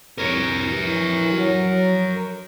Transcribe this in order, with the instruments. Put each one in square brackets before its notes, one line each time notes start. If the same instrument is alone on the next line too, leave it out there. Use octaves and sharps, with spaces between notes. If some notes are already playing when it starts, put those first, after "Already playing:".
[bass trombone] C2 [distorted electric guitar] A#4 C#5
[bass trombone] E3
F#3